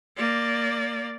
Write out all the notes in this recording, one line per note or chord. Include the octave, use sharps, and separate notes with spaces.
A#3 D5